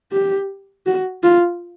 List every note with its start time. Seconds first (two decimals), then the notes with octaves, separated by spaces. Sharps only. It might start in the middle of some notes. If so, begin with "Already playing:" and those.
0.12 G4
0.86 F#4
1.23 F4